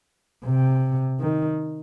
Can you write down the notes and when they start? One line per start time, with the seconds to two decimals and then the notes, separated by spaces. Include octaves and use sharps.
0.45 C3
1.20 D#3